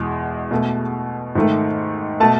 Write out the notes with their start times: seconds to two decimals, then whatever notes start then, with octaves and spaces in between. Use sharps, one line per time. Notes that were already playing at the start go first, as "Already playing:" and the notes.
Already playing: E2 B2 G#3
0.51 B2 A3
1.35 G#2 D#3 A3
2.20 B2 A3 A5